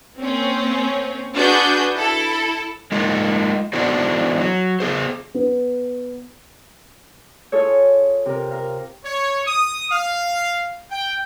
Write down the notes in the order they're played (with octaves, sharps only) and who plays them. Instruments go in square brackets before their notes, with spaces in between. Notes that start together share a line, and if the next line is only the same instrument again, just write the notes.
[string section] A#3 C4 C#4
D4 F#4 G#4 B4 G6
E4 A4
[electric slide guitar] G#3 A#3 D#4 F4
B3 D4 E4 F#4 C5
F#3
B3 G#4 C5
[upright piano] B3
[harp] F4 G#4 A4 C#5
C3 A#4
A#4 F5
[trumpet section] C#5
D#6
F5
G5